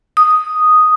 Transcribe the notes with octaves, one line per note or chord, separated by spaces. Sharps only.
D#6